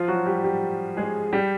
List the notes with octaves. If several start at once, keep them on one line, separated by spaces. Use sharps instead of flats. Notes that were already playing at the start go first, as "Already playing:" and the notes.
Already playing: F3 F4
F#3 F#4
G3 G4
G3 G4
G#3 G#4
G3 G4